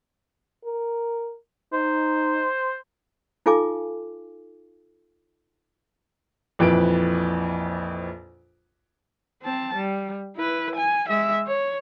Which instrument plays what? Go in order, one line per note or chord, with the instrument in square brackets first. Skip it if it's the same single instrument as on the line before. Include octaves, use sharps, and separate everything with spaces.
[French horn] A#4
[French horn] D#4 [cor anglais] C5
[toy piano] D#4 F4 A4 F5 G#5 D6
[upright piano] A#1 F2 E3 B4 D7
[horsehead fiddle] C4 A5
G3
E4 B4
G#5
G#3 E5
C#5